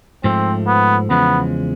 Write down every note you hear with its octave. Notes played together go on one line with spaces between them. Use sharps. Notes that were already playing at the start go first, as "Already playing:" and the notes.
G#2 F3 A3 C4
B3
E2 C#3 F3 G#3 B3